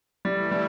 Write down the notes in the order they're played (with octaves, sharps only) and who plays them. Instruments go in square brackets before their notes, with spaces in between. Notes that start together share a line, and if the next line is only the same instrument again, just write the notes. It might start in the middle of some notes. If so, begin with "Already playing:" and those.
[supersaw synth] E3 A3 E4 [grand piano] G3
[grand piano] G3